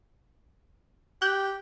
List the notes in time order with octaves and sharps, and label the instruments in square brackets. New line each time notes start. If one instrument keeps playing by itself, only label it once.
[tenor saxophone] G4 [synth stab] F#6 G6